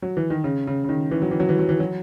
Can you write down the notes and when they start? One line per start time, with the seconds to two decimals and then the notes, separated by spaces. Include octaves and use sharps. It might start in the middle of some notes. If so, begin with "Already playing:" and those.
0.02 F#3
0.17 E3
0.30 D#3
0.44 C#3
0.67 C#3
0.84 C#3
0.89 D#3
1.11 E3
1.22 F#3
1.31 E3
1.40 F#3
1.49 E3
1.59 F#3
1.69 E3
1.80 F#3